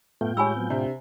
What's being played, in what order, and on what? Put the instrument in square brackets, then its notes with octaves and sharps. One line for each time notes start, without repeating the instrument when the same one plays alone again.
[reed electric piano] F#2 A3 B3 [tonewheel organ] A2 F4 G5
[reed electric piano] G#3 G4 C#5 [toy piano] G#5 B5 E6
[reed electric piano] F#3 B3 C4
[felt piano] C3 [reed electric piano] D4